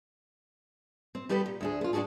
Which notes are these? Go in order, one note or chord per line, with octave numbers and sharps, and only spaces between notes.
C4
G3 B3 G4 A4 B4
A#2
D2 D4 G#4
B3 F4
D4 D#4 F#4 G#4 A4